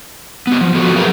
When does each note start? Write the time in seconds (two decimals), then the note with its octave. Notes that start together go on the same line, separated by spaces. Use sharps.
0.47 B3 G4
0.61 F3
0.75 F3 B3 F#4 A4
0.96 F#3 G#4 A#4 B4 E5 F5